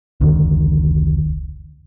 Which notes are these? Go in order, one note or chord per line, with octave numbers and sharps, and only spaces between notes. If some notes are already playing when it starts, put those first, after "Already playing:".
F1 C#2 D3 D#3